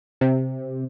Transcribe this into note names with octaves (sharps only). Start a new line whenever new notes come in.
C3